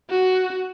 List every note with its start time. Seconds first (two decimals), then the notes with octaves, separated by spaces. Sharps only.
0.10 F#4